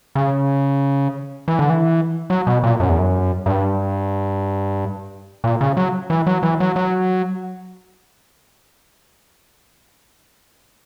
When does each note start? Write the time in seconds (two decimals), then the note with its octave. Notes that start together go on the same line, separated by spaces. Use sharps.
0.15 C#3
1.48 E3
1.59 D3
1.70 E3
2.30 F#3
2.47 B2
2.63 A#2
2.80 F#2
2.89 E2
2.99 F#2
3.46 G2
5.44 A#2
5.61 C#3
5.77 F#3
6.10 E3
6.27 F#3
6.43 E3
6.60 F#3
6.76 F#3